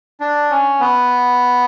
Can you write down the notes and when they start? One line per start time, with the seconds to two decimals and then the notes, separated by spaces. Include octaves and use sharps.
0.20 D4
0.50 C#4
0.80 B3